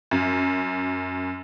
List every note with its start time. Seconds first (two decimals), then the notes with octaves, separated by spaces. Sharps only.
0.11 F#2